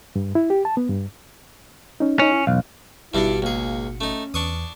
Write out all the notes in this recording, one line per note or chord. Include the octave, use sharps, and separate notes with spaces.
G2
E4
G4
A5
B3
G2
C#4 D#4
C#4 D#4 C#5
E4
B1 E2 F5
G#1 G2 B2 G3 D4 E4 F#4
C#2 A#3 G#4
A3 C#4 D#4
E2 D4 C#6 D#6